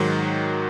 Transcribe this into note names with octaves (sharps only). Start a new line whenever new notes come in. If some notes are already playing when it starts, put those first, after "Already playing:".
Already playing: G#2 D#3 F#3